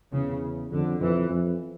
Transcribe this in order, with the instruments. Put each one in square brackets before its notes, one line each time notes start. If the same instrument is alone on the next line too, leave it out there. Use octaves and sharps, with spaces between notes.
[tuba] E2 [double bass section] C#3
[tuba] F2 [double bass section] D3
[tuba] F2 [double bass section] E3
[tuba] F2